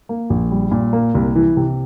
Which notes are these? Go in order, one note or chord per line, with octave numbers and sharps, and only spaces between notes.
A#3
A#1
G3
A#2
A#3
C2
E3
C3